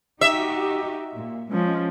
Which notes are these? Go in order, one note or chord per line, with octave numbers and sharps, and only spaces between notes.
D#4 F#4 G4 E5
A#2
F3 G#3 C#4